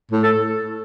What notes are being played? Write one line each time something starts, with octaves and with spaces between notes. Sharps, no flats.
A2
A4